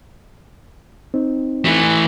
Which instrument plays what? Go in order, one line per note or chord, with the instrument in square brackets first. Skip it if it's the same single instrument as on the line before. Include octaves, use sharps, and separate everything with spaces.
[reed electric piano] C4 D#4
[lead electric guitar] E3 A3